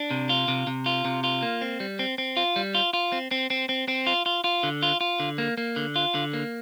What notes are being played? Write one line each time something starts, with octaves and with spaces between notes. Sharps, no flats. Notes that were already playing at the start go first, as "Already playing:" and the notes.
Already playing: D4
C3
F4
C3
C3
F4
C3
F4
A#3
C4
G3
C4
C4
F4
G3
F4
F4
C4
C4
C4
C4
C4
F4
F4
F4
D3
F4
F4
D3
A#3
A#3
D3
F4
D3
A#3